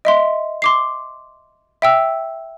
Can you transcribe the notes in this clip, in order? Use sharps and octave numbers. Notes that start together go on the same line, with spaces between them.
D#5 E5 C6
C6 D6 C7
E5 G5 E6